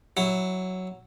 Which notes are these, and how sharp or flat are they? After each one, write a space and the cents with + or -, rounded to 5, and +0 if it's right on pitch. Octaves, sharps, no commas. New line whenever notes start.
F#3 +0 E4 -5